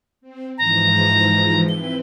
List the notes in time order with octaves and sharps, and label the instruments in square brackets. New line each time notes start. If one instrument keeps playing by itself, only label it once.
[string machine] C4
[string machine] G#2 E3 F3 [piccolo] A#5
[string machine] C4 E4 B4 [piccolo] G7